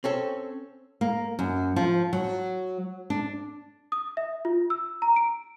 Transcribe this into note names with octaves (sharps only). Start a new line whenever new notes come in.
C4 C#4 A4
A#3
F#2
F3
F#3
D4
D#6
E5
F4
E6
A#5
D7